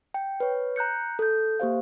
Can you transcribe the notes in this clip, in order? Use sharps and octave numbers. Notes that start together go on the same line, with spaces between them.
G5
B4 C#5
A#5 F#6 G6 C#7
A4 G6
A#3 G4 C5 F5